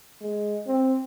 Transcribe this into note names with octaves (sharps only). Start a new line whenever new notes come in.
G#3
C4